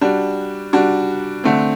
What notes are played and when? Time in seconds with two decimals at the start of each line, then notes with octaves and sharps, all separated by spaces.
0.01 G3 D4 F#4
0.73 G3 D4 F#4
1.44 D3 A3 C4